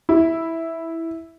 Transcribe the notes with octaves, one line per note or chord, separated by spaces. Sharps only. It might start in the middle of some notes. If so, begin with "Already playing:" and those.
E4